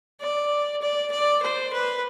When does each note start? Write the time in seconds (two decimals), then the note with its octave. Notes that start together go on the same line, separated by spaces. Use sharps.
0.22 D5
0.82 D5
1.12 D5
1.43 C5
1.73 B4